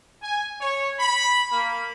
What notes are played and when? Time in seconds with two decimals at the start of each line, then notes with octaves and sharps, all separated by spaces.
0.22 G#5
0.60 C#5
1.00 B5
1.52 A#3